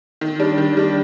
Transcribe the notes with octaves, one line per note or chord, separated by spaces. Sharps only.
D#3
G3 D4
D#3
G3 D4